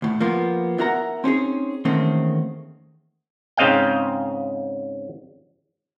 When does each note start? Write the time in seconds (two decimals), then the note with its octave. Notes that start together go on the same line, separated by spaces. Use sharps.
0.02 D2 A2
0.20 F3 A#3 B3 F4
0.78 B3 E4 F#4 A#4 F#5 A#5
1.24 C4 C#4 D#4 G#4
1.85 E2 D#3 A3 A#3 C4 C#4
3.57 G#2 C#3 C4 D#5 F5 G5